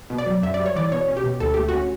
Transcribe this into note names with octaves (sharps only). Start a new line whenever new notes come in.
B2
D5
F#3
F#2 E5
D5
G3
C#5
E3 D5
B2 C#5
C#4
G4
B2
D2 A4
A3 G4
C#4 F#4